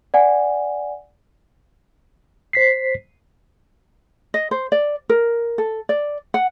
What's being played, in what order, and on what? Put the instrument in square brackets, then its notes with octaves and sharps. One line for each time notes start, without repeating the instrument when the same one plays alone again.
[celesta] D5 F#5 G#5
[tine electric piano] C5 B6 C7
[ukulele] D#5
C5
D5
A#4
A4
D5
F#5